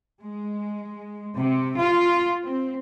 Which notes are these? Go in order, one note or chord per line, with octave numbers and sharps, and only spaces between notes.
G#3
C3
F4
C4